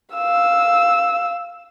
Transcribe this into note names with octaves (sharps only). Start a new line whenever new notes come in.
F5 E6